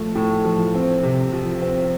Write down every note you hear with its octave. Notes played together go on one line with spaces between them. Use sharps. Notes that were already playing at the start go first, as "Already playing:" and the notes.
Already playing: F3 A3
A2
F3
C4
C3
F3
C4